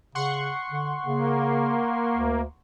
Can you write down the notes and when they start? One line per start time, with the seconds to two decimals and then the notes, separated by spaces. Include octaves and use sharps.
0.15 C#3 F#5 C6 C#6
0.72 D3
1.05 C#3 A#3
2.16 D2